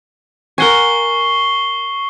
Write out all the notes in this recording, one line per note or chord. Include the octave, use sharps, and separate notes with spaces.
A#4 F#5 G#5 C#6 C7 G7